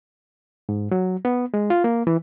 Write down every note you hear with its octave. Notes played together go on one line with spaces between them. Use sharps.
G#2
F#3
B3
G#3
F4
A#3
E3